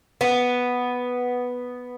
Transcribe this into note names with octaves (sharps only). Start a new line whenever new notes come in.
B3